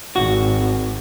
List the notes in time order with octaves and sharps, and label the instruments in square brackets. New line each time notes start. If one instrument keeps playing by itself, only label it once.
[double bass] G#1 [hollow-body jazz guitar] F#4